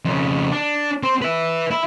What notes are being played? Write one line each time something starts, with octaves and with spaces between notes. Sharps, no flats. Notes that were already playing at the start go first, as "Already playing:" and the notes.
F2 C#3
D4
C4 C5
B4 E5
E4